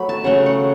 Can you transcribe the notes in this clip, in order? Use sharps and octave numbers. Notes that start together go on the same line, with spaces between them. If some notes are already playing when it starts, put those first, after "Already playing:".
Already playing: F#3 A3 B5
A5
C#3 F#3 A3 F#5
F#5